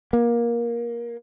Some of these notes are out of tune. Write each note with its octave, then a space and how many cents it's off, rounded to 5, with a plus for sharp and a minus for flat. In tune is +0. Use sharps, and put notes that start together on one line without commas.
A#3 +20